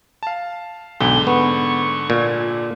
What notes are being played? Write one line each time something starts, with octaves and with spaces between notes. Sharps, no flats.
F5 A5
B1 G#2 D3 G7
B3 C#6
A#2